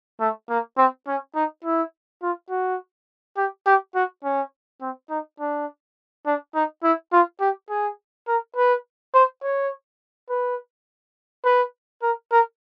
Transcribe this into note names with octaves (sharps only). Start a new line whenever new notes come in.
A3
A#3
C4
C#4
D#4
E4
F4
F#4
G4
G4
F#4
C#4
C4
D#4
D4
D4
D#4
E4
F4
G4
G#4
A#4
B4
C5
C#5
B4
B4
A#4
A#4